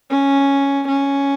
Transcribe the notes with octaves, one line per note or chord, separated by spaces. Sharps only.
C#4
C#4